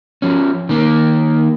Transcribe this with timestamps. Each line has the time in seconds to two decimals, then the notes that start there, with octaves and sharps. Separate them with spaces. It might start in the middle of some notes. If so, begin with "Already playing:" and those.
0.22 F3 C#4
0.69 D#3 A#3